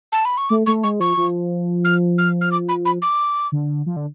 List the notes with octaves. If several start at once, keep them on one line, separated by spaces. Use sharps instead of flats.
A5
B5
C#6
A3 D6
A3 C#6
G#3 C#6
F3 C#6
F3
F6
F6
F6
D6
B5
B5
D6
D3
F3
D3